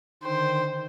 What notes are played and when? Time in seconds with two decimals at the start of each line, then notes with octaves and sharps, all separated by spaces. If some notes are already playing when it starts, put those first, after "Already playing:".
0.23 D3 D#3 C5 G5